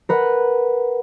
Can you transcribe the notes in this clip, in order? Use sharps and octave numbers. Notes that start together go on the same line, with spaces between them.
A#4 B4 F#5